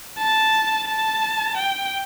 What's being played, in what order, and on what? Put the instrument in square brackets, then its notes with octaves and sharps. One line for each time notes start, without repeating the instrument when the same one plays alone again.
[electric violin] A5
A5
G5